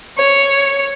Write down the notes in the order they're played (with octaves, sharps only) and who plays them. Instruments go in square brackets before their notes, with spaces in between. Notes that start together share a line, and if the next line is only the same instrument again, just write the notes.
[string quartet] C#5